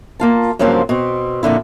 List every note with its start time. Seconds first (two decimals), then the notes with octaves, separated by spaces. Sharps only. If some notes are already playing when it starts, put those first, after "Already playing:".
0.20 A#3 F4 A5
0.59 G2 C#3 F3 F#3 A#3 C4
0.89 B2 C4
1.43 F2 A#2 D3 E4